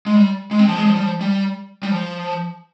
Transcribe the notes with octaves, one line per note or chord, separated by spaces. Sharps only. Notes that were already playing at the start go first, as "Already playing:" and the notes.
G#3
G3
G#3
C4
F3
G#3
F3
G3
F3
G3
G3
F3